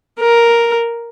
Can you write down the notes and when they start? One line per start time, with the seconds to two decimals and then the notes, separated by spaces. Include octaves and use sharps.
0.21 A#4